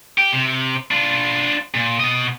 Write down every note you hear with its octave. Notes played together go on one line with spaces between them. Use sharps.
G4
C3
D4 F4
A#2
B2 D#5